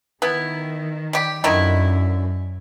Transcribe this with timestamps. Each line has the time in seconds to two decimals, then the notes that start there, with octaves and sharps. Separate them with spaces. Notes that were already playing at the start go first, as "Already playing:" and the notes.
0.22 D#3 B3 E4
1.13 G3 G4
1.44 F#2 D3 D#3 E4